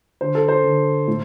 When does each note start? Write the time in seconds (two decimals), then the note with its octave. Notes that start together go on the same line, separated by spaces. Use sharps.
0.21 D3 C5
0.35 A4
0.48 C5
0.64 D3
1.08 A2